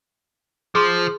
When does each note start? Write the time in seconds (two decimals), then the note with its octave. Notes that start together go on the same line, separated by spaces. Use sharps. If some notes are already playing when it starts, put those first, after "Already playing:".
0.75 F3 G#4 C6